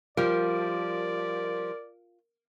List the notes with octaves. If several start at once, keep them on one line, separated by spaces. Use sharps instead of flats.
F3 G3 F4 A#4 D5